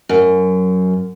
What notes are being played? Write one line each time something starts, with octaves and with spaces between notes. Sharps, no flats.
F#2